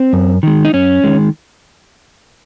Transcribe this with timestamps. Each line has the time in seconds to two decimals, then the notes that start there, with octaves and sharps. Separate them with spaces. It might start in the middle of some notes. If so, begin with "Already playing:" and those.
Already playing: C4
0.13 F#2
0.43 D#3 G#3
0.65 D#4
0.73 F#2 C#4
1.04 D#3 G#3